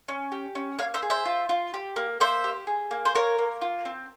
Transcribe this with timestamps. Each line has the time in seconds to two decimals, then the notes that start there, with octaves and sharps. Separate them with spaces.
0.08 C#4
0.32 G4
0.55 C#4
0.79 A#3 C#5 F5
0.94 C5 E5
1.02 G#4
1.10 C5 E5
1.25 F4
1.49 F4
1.74 G4
1.96 A#3
2.20 A#3 C5 E5
2.44 G4
2.67 G#4
2.91 A#3
3.05 C5
3.15 A#3 A#4 C#5
3.38 A#3
3.61 F4
3.85 C4